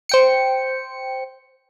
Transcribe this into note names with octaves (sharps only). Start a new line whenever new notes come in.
C5 G5 C#7